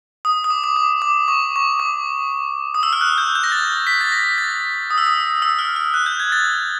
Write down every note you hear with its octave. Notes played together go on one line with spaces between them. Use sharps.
D#6
D#6
D6
D6
D6
D6
C#6
C#6
D6
D#6
E6
F6
F#6
G6
G6
A#6
A6
B6
A6
A#6
A6
D#6
E6
D#6
E6
F6
F6
F#6
G6
G#6
A6